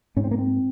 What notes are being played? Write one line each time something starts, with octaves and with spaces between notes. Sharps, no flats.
G#2 C#4
C4
A#3
C4